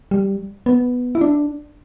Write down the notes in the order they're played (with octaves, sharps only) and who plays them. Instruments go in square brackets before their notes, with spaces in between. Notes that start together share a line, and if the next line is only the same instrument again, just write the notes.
[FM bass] G3
B3
E4
D4